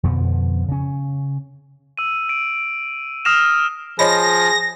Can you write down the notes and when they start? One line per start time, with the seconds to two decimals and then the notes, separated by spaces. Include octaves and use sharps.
0.03 F2 B2 D3 F3
0.68 C#3 C#4
1.98 E6 D#7
2.29 D7
3.25 D#6 F6 A#6 C7 E7 F7
3.99 F3 G#4 C#5 D#5 B5 A#6